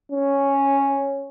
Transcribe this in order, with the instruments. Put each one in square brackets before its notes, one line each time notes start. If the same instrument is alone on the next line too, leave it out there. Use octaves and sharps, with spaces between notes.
[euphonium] C#4